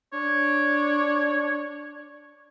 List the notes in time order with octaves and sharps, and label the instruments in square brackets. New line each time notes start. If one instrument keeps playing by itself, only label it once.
[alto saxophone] D4 [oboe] C#5